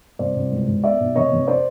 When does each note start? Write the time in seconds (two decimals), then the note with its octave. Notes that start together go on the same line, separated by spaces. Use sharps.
0.19 C2 C5 D5
0.35 C2
0.51 C#2
0.68 C#2
0.84 B3 D5 E5
1.00 B1
1.15 F1 C#5 D#5
1.32 F1
1.47 C5 D5